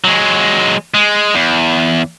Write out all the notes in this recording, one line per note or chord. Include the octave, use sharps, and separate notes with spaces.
F#3 G#3
G#3
E2